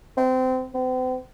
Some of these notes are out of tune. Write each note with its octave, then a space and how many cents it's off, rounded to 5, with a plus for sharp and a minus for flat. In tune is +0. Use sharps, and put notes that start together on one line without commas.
C4 -25
C4 -40